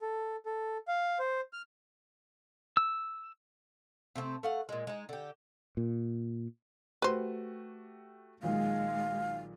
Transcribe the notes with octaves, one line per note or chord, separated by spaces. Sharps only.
A4
A4
F5
C5
F6
E6
C3 A3 A#3 C4
A3 F5 F#5
A#2 G#3
G#3 D#4
D3 G4
A#2
A3 F#4 G4 B4 C5
B1 A#2 D#3 G#3 F5